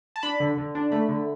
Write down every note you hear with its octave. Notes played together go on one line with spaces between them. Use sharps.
A5
D4 B5
D3
D3
D4
A3 B5
D3